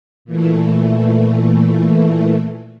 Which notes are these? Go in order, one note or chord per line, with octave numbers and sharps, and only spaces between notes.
A#2 E3 A3